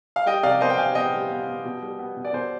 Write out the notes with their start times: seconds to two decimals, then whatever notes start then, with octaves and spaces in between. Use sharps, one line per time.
0.16 F5
0.26 G3 D#5 G5
0.43 C3 D5 F5
0.61 B3 C5 D#5
0.70 G5
0.78 C3 F5 G#5
0.95 B3 D#5 G5
1.13 G3
1.31 B3
1.47 B3
1.65 B2
1.82 G3
1.99 B3
2.17 B2
2.24 D5
2.33 B2 C5